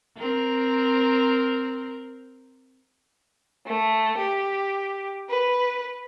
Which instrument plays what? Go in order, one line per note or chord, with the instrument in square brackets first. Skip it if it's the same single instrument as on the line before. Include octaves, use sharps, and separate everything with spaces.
[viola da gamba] C4 A#4
[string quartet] A3
G4
B4